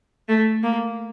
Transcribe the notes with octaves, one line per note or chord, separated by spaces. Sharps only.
A3
A#3